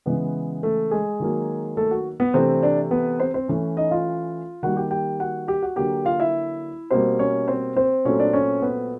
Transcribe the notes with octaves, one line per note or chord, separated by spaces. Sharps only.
C#3 E3 G#3 B3 B4
A3 A4
G#3 G#4
D#3 F#3 A#3
A3 A4
F#4
B3 B4
C3 E3 A3 C4 D4 C5
D4 D5
B3 B4
C4 C5
C4 C5
E3 A3 C#4
D#4 D#5
F4 F5
D#3 G3 A#3 F#4 F#5
G4 G5
G4 G5
F#4 F#5
G4 G5
F#4 F#5
D3 F#3 A#3 G4 G5
F4 F5
E4 E5
B2 G3 A#3 C4 C5
C#4 C#5
C4 C5
C4 C5
A#2 F#3 A3 C4 C#4 C#5
D4 D5
C#4 C#5
B3 B4